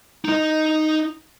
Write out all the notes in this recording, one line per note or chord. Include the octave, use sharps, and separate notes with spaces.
D#4 D#5